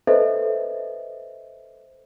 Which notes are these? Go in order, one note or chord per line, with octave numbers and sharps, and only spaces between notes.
A4 B4 C5 D#5 E5